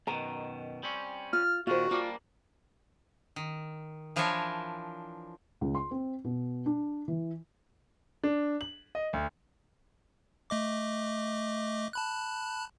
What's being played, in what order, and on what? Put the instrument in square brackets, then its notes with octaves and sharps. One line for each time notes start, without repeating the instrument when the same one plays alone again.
[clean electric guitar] F#2 B2 D#3 [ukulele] A#5
[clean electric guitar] G3 C4 C#4
[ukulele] F4 [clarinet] F6
[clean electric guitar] A#2 D#3 [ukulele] F4 C5 [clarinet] F#4
[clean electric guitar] G3 A#3 D4 [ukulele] F4
[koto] D#3
E3 F3 D4 E4 A#4 C#5
[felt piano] C#2
C6
C4
B2
D4
E3
[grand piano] D4
F#7
D#5
D2
[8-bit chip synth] A3 D#5 D6
A5 B5 F#6